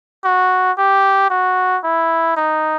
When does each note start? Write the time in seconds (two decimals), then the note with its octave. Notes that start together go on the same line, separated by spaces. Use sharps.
0.24 F#4
0.78 G4
1.30 F#4
1.84 E4
2.37 D#4